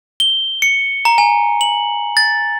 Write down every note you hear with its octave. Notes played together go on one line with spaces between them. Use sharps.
G7
C#7
A#5
G#5
F#7
A6